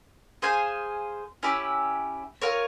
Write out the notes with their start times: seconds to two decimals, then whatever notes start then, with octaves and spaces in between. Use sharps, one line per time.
0.42 G#4 C5 F5 G#5
1.43 C#4 E4 G4
2.42 F4 A#4 C#5